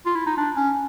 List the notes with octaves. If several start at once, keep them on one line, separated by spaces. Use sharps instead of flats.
F4
E4
D#4
D4
C#4